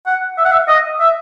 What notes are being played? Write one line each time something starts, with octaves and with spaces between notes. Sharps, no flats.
F#5
E5
F#5
E5
D#5
E5